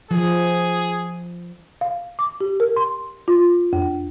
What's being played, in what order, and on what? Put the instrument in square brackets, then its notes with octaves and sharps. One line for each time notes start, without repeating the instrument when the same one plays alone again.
[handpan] F3 [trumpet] G#4
[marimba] F5
D6
G4
A#4
C6
F4
F2